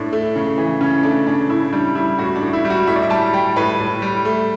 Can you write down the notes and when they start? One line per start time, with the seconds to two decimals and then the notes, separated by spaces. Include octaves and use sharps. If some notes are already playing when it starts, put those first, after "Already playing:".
Already playing: A2 D4
0.13 A3
0.36 C#3
0.58 E3
0.81 C#3 C#4
1.03 A3 D4
1.27 C#3 D4
1.50 A2 E4
1.73 G3 D4
1.95 G3 E4
2.19 A2 F#4
2.36 D4
2.42 A2
2.53 E4
2.65 G3
2.70 F#4
2.87 A2 E5
2.95 D5
3.02 E5
3.10 G3 A5
3.33 G3 G5
3.56 A2 B4
3.80 A2
4.02 G3
4.25 A3